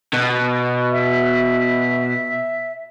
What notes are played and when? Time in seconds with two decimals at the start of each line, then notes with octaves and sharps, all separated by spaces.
0.14 B2
0.92 E5